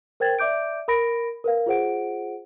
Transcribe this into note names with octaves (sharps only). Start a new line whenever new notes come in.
A#4 C5 G5 G#6 A6
D5 E5 D6 G6 D7
A#4 B5 A#6 D7
A#4 B4 F5
F4 G#4 C5 F#5 D7